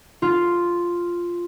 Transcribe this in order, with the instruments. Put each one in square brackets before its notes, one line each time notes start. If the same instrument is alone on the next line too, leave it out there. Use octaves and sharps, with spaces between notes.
[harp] F4